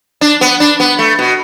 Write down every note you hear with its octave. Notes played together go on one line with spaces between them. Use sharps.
D4
B3
D4
B3
A3
B2